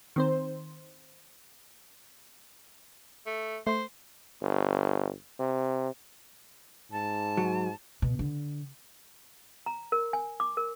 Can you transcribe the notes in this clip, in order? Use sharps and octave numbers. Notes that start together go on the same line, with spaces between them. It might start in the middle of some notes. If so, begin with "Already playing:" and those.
D#3 C4 C5
A3
A3 C5 C6
G1
C3
G#2 A5
F#3
B2
D3
A#5
A#4
G#5
D6
A#4